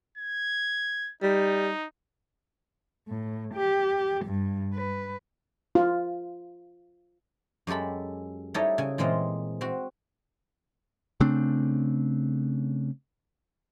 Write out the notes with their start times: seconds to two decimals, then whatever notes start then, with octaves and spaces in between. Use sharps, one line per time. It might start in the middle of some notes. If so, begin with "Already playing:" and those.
0.18 G#6
1.22 G3 D#4
3.08 A2
3.54 G4
4.26 G2
4.74 B4
5.75 F4
7.67 F#2 G#3 G4 A4 B5
8.54 G3 D#4 E4 A4 C#5 D#5
8.78 C#3 G#5
8.98 A#2 E3 G#3 C4 F4 D#5
9.61 C4 F#4
11.20 C#3 A3 C4 D4